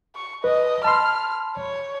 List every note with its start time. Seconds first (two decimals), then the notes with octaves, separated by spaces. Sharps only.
0.16 C#6
0.44 B4 D#5
0.84 A5 B5 C6 F6
1.57 C#5